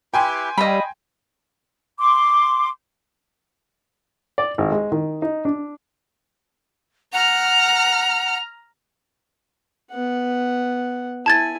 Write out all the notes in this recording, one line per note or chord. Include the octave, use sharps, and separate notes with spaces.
E4 G4 B4 G5 G#5 C6
G3 D#5 F5 B5 E6
C6 D6
D5
G#1
G#3
D#3
D#4
D4
F#5 A#5 F6
B3 F#5
E4 G#5 A5 G#6 A6